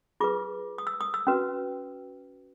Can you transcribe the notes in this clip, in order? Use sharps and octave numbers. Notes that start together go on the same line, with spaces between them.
F4 G#4 B4 D6
D#6
E6
D#6
E6
C#4 F#4 B4